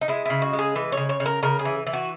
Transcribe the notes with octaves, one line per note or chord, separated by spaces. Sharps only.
D#4
G#3 E4
C#3 E4
F#4
G#3
G#4
E3 B4
C#3 C#5
C#5
C#3
A#4
C#3 A#4
G#4
E3
E3
F#4